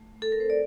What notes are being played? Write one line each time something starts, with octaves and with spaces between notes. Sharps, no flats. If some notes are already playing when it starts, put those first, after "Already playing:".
Already playing: A3
A3
A4
A#4
C4 C5
D5